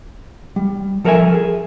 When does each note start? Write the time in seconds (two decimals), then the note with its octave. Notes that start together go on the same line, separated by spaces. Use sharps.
0.56 G3
1.04 F3 A4 A#4 C#5 E5 G#5
1.34 G#4